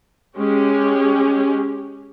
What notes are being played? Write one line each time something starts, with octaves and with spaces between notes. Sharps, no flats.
G#3 C#4 G4